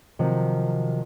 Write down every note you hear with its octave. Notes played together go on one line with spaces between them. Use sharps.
C3 D#3 F3 F#3